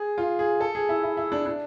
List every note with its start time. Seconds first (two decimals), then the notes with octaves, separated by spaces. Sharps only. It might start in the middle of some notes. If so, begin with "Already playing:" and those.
Already playing: G#4
0.18 F4
0.39 G#4
0.61 A4
0.75 G#4
0.89 E4
1.03 E4
1.17 E4
1.32 D4
1.46 D4